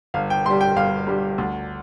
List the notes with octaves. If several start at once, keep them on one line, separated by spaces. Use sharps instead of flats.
G1 F5
G5
G2 C6
G3
G5
G1 F5
G2 G3
D2